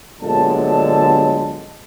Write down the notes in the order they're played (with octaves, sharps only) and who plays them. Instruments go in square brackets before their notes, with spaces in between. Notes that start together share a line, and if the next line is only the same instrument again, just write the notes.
[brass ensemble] G1 A#2 D3 F#3 G#3 A5